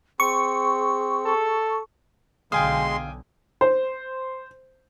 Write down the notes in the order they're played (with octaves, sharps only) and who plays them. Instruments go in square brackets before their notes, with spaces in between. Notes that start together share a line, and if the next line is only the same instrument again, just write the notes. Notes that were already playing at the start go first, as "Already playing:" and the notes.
[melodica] C4 [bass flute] G#4 [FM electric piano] C#6
[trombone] A4
[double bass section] B1 D3 [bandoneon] G#3 C6 [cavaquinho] F5 [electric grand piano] G5 G#5 D#6
[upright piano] C5